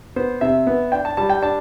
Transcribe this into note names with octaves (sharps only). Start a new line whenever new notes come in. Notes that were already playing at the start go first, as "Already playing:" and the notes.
B3 C5
C3 E5
B3
D4 G5
A5
G3 A5
G5
D4 A5